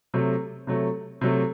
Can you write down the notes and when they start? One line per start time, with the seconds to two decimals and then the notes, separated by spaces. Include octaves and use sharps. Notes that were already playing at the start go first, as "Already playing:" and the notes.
0.14 C3 F#3 A3
0.67 C3 F#3 A3
1.21 C3 F#3 A3